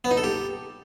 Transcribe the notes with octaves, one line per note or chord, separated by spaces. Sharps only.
B3
D#4
A4
G4